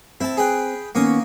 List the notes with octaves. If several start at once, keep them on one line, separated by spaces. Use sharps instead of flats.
C4 E4 A5
G#4 B4 G5
D#3 A#3 B3 C#4 C#6 D#6